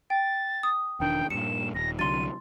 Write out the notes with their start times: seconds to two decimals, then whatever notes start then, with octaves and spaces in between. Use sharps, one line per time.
0.10 G5 A6
0.63 D#6
1.00 E1 D#3 D4 G5
1.30 G2 A#2 C#7 E7
1.74 D#1 A#6
1.99 C2 D3 F#3 C6 A6 D#7